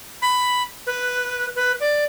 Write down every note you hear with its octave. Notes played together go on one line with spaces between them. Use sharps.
B5
B4
B4
D5